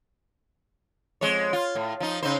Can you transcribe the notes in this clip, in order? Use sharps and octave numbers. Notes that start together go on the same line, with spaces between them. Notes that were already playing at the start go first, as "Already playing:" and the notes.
F2 G#3 C#5
F4
A2
F3 D#4
C#3 D#4 C5